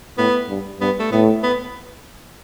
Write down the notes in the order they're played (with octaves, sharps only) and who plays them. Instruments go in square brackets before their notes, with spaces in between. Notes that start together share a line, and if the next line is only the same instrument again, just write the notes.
[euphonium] A2 [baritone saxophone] B3
[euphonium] G2
[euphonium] G2 [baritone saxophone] B3
[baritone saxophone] A3
[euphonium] A2 [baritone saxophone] B3
[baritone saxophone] B3